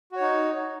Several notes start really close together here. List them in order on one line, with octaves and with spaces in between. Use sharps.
F#4 C#5 D#4